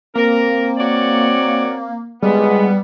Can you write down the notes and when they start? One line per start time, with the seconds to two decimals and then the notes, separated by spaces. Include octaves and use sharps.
0.15 A#3 C4 A#4
0.77 F#4 C#5 D5
2.23 G3 G#3 B3